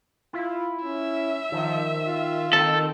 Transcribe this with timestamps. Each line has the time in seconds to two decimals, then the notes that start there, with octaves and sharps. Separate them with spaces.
0.33 E4 F4
0.84 C#4 E5
1.52 D#3 F3
2.06 F4
2.53 D#3 C4 A4